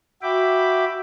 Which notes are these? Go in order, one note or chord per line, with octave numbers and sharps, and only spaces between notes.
F#4 E5 G5 B5 D6